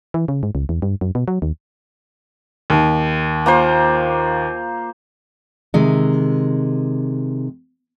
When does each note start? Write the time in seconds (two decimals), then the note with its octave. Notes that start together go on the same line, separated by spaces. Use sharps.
0.14 E3
0.28 C#3
0.43 G#2
0.55 C#2
0.69 E2
0.82 G2
1.01 F#2
1.15 B2
1.28 F#3
1.42 D#2
2.70 D#2
3.46 A#3 F4 C5
5.74 C3 D#3 G#3